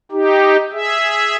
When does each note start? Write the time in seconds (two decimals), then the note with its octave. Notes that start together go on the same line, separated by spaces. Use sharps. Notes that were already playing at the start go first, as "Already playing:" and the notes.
0.12 D#4 G4
0.72 G#4 E5